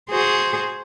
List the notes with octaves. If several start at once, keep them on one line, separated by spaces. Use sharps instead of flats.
F#4 G#4 C5